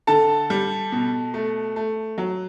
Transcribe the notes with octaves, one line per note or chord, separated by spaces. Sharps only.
D3 A4 A5
G3
B2
A3
A3
F#3